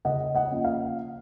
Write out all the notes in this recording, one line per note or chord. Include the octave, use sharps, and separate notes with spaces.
C#3 D#5 F#5
D#5 F#5
F3 A#3 C#4 F4
F5